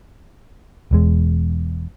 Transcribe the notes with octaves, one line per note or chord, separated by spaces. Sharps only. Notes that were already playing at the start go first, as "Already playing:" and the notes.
E1 E2 G#3